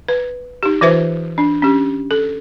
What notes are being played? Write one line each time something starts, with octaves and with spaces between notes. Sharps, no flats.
B4
D#4 G4
E3 F4 B4 C5 E5
D4
C#4 G4
A4